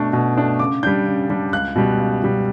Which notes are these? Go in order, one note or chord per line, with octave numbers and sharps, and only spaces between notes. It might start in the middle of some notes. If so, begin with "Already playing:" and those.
Already playing: B2 A3 D4 C#6
B2
A3 D4
C#3 D6
G3 D4 G6
C#3
G3 D4
C#2 F#6
B2 G3
C#2
B2 G3